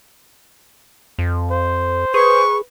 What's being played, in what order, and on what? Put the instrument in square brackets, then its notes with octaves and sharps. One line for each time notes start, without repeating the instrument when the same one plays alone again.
[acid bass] F2
[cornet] C5
[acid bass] G#4 [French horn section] B4 [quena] C#6